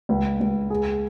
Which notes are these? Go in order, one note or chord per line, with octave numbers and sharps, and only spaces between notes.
C#2
C#2
G#4